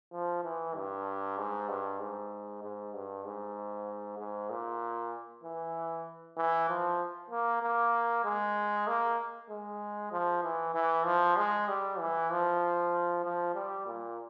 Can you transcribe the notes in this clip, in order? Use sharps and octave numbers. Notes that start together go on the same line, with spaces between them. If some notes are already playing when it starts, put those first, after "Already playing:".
F3
E3
G2
G#2
G2
G#2
G#2
G2
G#2
G#2
A#2
E3
E3
F3
A#3
A#3
G#3
A#3
G#3
F3
E3
E3
F3
G#3
G3
E3
F3
F3
G3
A#2